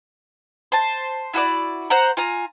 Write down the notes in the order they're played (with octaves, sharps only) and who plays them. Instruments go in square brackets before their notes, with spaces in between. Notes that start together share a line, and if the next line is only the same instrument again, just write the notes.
[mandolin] C5 A5
E4 F#4 A4 D5
C5 F#5 A#5
F4 G#5 A#5